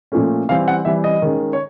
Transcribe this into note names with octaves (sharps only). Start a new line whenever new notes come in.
A#2 F3 A3 C#4
E3 G3 C4 F5
F#5
E3 G3 C4 E5
D#5
D#3 G#3 C#4
C#5